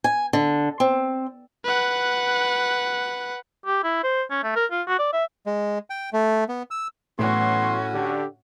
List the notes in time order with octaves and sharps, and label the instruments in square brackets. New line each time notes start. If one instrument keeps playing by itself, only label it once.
[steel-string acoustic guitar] G#5
D3
C4
[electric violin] B4 F#5
[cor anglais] G4
E4
C5
C#4
A3
A#4
F4
F#4
D5
E5
[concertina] G#3
G5
A3
B3
E6
[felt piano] A2 [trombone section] E3 F#3 B3 [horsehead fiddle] C#4 F#4 [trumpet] C6
[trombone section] D3 [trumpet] G4